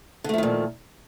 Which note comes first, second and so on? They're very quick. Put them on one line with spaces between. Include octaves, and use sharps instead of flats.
D3 A3 F3 D#3 A#2